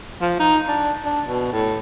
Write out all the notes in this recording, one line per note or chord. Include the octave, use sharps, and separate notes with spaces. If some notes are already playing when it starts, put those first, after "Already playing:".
F3
D#4
D4
D4
B2
A2